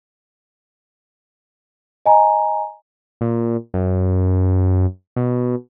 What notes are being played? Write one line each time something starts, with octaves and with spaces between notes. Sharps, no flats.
D#5 G#5 A#5
A#2
F#2
B2